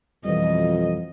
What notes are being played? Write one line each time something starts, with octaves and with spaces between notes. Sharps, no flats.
F2 B2 E3 G3 D#5